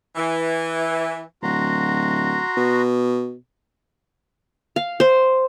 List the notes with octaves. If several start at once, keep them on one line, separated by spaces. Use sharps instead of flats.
E3
D1 F#4 A#5 C6
B2
F5
C5